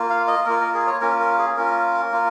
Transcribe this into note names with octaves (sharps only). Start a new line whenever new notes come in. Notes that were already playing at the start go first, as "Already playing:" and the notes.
Already playing: A#3 F4
F5
D#5
A#3 F4 A#4
A#4
G#4
C#5
A#3 C#4 F4 A#4
A#4
G#4
A#3 C#4 F4 A#4
A#3 F4